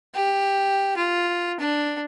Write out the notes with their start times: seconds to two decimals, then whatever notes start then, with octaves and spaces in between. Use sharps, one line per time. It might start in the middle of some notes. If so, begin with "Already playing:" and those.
0.15 G4
0.97 F4
1.60 D4